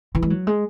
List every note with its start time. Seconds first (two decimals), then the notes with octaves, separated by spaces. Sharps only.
0.15 E3
0.23 G#3
0.30 F#3
0.47 G#3